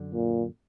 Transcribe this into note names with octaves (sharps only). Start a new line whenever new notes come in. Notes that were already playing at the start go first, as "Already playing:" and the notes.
Already playing: F#2 D3
A#2